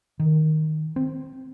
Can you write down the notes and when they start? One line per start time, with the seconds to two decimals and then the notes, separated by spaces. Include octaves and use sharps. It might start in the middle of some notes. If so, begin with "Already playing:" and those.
0.20 D#3
0.96 C4